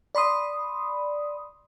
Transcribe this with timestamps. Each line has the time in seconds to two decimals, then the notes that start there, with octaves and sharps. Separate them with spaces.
0.15 D5 B5 C6 D#6